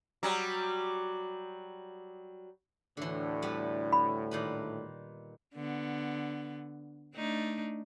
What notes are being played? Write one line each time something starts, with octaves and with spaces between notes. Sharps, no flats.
F#3 G3
D2 A2 D3 E3
G3 B3 B4
B5
A#2 D#3 B4
D3 B3
A3 D4 D#4